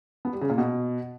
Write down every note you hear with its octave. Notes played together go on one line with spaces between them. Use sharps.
B3
G3
C#3
A#2
B2